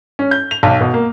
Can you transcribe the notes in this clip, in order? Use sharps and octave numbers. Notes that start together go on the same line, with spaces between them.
C#4
G6
F7
B1
B2
A#3